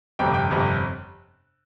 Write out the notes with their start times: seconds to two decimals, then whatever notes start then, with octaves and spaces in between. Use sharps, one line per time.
0.19 G1 F2 C3 G5
0.34 G5
0.50 G1 F2 C3